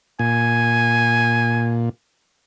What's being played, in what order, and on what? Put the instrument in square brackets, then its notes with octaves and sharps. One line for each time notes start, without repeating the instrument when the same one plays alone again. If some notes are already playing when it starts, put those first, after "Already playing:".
[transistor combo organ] A#2 [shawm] G#5